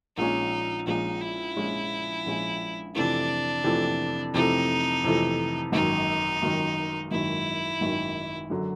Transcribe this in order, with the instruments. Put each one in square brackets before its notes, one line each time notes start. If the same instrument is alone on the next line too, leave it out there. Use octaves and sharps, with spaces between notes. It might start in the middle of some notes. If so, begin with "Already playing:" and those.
[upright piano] A#1 A#2 F3 G#3 C#4 [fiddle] D#4
[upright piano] A#1 A#2 F3 G#3 C#4 [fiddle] D#4
[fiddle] E4
[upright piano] A#1 A#2 F3 G#3 C#4
A#1 A#2 F3 G#3 C#4
[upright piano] F2 C3 E3 A3 [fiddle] D4
[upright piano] F2 C3 E3 A3
[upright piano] F2 C3 E3 A3 [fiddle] D#4
[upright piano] F2 C3 E3 A3
[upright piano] G#1 F#2 D#3 [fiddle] D#4
[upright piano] G#1 F#2 D#3
[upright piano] G#1 F#2 D#3 [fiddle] E4
[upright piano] G#1 F#2 D#3
F#2 D3 F#3